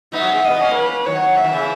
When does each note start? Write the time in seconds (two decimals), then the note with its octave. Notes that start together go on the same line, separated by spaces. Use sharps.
0.13 B3 D#4 E5
0.23 F#3
0.32 G#3
0.42 A#3 D#5
0.50 B3
0.59 A#3 C#4
0.75 B4
1.06 D#3 F#3 C#5
1.37 E5
1.44 D#3
1.52 C#3 E3